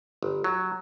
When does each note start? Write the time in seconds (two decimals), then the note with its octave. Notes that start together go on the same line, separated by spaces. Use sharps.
0.23 G1
0.44 F#3